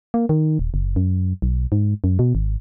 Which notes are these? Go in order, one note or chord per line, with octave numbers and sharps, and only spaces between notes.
A#3
D#3
D#1
F#1
F#2
B1
G#2
F#2
B2
G#1